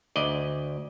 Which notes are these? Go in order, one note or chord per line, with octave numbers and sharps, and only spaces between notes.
D2 D5 D#5